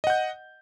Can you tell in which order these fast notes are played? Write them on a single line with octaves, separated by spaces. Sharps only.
D#5 F#5 G6